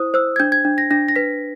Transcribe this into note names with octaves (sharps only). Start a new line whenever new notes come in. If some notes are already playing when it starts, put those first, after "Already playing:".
Already playing: E4 C5 D#6
C5 E6
G#6
D4 G6
G#6
D4
A#6
D4 A#6
A#6
B4 B6